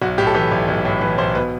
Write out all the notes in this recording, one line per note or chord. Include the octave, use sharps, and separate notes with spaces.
B1 F#4
A2 G4
A4
E3 G4
B1
B1
A2
E3 B4
B1 C5
B2 B4